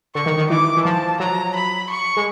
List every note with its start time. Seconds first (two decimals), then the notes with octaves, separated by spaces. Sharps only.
0.15 D3 C#6
0.26 D#3
0.38 D#3
0.50 E3 D6
0.77 E3
0.85 F3 A5
1.20 F#3 A#5
1.56 B5
1.90 C#6
2.17 G#3